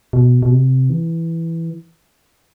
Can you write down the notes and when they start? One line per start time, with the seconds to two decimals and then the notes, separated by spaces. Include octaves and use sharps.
0.13 B2
0.43 B2
0.52 C3
0.90 E3